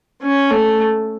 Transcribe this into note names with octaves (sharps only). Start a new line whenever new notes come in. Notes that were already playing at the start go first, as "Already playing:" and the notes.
C#4
A3